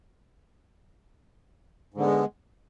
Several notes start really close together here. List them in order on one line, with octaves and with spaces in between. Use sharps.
G#2 D3 B3 G#3